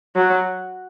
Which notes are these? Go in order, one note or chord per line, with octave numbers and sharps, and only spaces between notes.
F#3